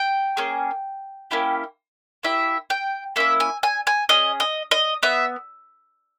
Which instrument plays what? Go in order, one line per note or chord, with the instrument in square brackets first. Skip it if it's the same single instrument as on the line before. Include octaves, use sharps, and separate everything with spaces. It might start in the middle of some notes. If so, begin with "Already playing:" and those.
Already playing: [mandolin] G5
A#3 C#4 G#4
A#3 C#4 E4 G4
A#3 E4 G4 E5
G5
A#3 C#4 E4 E5
G#5
G#5
G#5
C#4 G#4 D#5
D#5
D#5
B3 E5